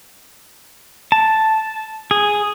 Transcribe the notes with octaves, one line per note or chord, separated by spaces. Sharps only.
A5
G#4